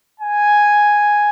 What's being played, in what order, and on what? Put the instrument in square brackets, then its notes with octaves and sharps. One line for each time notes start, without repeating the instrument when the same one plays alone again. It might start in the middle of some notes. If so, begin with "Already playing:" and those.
[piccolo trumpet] G#5